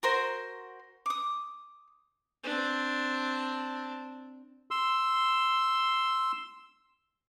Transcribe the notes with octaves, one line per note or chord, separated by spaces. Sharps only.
F#4 A#4 C5 C6
D6 D#6
C4 D4
C6 E6